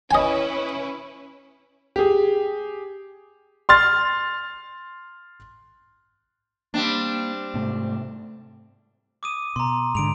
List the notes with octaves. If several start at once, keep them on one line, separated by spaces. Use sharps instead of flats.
C#4 E4 B4 D#5 G#5
G4 G#4
C6 F6 A6
G3 A#3 C4 D4
G#2 C3 A3
D6 D#6 D#7
B2 A#5 C6
G#2 D3 D7 F7